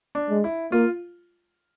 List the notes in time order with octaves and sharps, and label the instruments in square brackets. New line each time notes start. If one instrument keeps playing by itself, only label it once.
[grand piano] D4
[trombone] G#3
[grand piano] E4
[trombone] A#3 [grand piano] F4